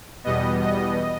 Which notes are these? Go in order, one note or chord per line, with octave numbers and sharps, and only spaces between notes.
E2 B2 G3 B3 D#5
D#5